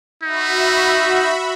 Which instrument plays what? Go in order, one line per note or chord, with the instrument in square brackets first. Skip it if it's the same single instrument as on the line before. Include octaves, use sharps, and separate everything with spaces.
[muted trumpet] D#4 [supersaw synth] F#4 E5 B5